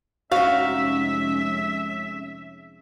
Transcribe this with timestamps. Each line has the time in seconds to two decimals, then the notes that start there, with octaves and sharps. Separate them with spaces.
0.32 F1 G#3 C#4 D#4 F#4 E5 F5